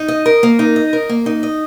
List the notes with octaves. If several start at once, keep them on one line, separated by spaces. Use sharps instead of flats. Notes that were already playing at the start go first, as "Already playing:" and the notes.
Already playing: D#4
D#5
A#4
A#3
D#4
D#5
A#4
A#3
D#4
D#5